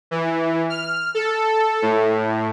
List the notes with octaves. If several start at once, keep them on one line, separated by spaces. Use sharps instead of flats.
E3
F6
A4
A2